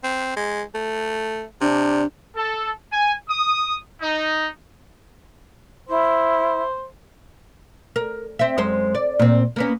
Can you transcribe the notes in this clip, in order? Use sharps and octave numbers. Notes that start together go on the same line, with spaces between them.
C4
G#3
A3
C3 D4
A4
G#5
D#6
D#4
E4 C5
A#4
C4 E5
F#2 G#3 C5
D5
A#2 C4
A#3 B3 C#4